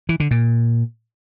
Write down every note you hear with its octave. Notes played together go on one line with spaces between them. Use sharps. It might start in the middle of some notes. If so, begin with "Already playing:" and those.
E3
D3
A#2